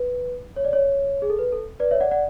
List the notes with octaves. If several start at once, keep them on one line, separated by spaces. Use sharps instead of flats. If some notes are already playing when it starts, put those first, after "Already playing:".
Already playing: B4
C#5
D5
C#5
G#4
A4
B4
A4
B4 D5
C#5 E5
D5 F#5
D5 F#5